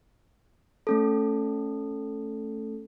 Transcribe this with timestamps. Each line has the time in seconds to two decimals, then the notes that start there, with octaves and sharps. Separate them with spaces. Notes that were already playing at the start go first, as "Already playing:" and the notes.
0.87 A3 C#4 A4